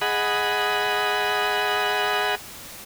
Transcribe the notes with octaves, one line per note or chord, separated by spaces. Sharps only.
G#4 D#5 F#5 B5